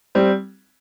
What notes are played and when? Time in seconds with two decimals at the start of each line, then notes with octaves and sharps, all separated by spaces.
0.15 G3 C4